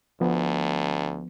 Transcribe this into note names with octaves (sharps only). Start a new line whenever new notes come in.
D2 F3 B3